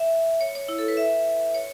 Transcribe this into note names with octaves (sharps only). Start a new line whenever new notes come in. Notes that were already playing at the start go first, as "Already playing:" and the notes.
Already playing: E5
C#5
C#5
E4
A4
B4
E5
C#5